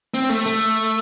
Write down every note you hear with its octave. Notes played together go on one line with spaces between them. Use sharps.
C4
A3
A3